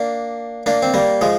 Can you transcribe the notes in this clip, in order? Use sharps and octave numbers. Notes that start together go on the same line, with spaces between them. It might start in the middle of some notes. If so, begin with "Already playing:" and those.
Already playing: A#3 D4
A#3 D4
C4
G3 A#3
F3 G#3